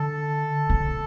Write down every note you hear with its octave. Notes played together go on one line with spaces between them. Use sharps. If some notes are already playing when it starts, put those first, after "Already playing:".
Already playing: D3 A4
C#3